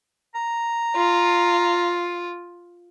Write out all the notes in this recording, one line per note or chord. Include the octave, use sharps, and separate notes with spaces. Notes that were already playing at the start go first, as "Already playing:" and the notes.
A#5
F4